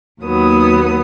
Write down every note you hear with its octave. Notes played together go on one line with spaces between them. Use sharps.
D#2 F#3 B3 D#6